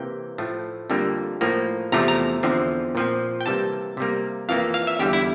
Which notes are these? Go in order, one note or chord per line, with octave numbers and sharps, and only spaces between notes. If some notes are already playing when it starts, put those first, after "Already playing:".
Already playing: C3 E3 A#3 G5
A2 F3 A3
F2 D3 G3 A#3
A2 F3 A#3
E2 C3 F3 A3 A#5
A#5
E2 D3 F3 C4
A#2 F3 C4
G5
C3 E3 G3 A#3 A5
C3 G3 A#3
F2 E3 A#3 F5
F5
E5
E2 D3 G3 G4
E4